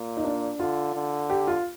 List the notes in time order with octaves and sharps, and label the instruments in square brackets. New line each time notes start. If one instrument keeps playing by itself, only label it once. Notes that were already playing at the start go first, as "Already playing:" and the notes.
Already playing: [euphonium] A#2
[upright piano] D#4
D4
[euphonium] D3 [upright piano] F4
[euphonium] D3
[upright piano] G4
F4